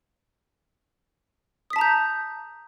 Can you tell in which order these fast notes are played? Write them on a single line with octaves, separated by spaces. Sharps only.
D#6 B6 A5 A#5 G6